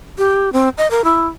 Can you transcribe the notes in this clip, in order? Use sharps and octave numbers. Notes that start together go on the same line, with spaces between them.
G4
C4
D#5
A#4
E4